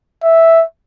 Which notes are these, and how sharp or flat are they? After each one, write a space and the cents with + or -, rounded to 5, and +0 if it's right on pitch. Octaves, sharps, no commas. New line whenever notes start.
E5 -5